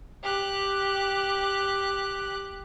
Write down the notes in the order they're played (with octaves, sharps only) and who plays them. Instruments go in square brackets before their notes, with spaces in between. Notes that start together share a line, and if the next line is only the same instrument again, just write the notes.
[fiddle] G4 F#6